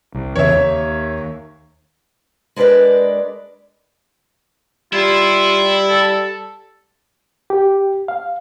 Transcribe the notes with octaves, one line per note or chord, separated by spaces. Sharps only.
C2
E2 C#3 C#5 E5
D#2
G#3 D4 A#4 B4 D5
G3 E4 F4
A4
G4
F5